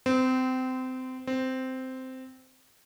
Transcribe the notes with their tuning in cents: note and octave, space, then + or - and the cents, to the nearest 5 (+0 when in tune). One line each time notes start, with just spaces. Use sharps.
C4 -25
C4 -10